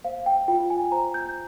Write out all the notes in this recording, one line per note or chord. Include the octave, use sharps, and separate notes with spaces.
C5 F5
G5
F4 G5
G#5
C5 A#5
G6